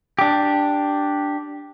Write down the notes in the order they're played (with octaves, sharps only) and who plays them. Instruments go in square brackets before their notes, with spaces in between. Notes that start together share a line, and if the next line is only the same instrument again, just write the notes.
[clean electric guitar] D4 G4